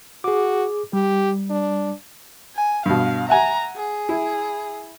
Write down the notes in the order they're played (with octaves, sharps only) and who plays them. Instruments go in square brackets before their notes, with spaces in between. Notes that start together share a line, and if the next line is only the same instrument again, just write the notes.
[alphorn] F#4 [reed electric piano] G#4 D6
[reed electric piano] G3 [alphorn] G4
[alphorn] D4
[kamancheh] G#5
[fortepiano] G2 B2 [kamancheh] F5
[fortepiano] E5 F#5 G#5 [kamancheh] A#5
[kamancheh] G#4
[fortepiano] E4